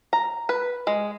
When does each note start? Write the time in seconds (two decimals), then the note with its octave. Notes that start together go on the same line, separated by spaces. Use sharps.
0.13 A#5
0.49 B4
0.87 G#3